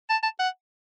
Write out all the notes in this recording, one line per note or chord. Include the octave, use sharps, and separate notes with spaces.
A5
A5
F#5